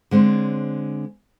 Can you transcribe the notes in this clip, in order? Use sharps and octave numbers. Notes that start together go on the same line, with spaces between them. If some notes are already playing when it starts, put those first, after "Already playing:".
D3 G#3 C4 C#5